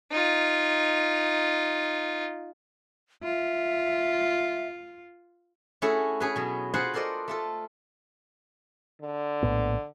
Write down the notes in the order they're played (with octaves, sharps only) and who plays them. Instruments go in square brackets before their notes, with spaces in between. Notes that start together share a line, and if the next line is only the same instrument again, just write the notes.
[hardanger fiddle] D#4 F4
[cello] F4 [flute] E5
[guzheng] A3 C#4 E4 F#4 G#4 A4
C#4 G#4 B4
B2 F#3
F4 F#4 G#4 B4 C5 F#5
A4 A#4 C5 D5 D#5
A3 F4 A4
[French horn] D3
[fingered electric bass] A#1 A2 B3